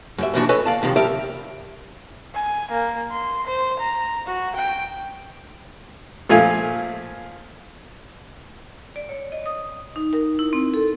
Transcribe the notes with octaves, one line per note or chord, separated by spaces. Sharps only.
F#2 G3 E5
F#2 A#2 E3 F3 D4 F#4
A4 B4 C#5 D#5 G#5
D5 F5 A5
F#2 C3 D#3 F3
F3 G3 G4 A#4 D5 E5
G#5
A#3
C6
C5
A#5
F#4
G5
A#2 F3 A3 F5 G#5
D5
C#5
D#5
D#6
D#4
A#4
E4
C4
A4